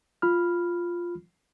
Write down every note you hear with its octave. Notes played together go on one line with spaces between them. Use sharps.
F4 B5 F6